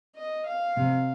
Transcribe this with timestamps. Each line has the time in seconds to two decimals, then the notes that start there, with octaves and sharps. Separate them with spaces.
0.16 D#5
0.46 F5
0.77 C3